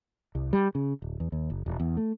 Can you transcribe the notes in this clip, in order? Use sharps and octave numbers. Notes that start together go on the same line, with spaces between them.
C2
G3
C#3
D1
E2
D#2
F#1
E1
E2
A3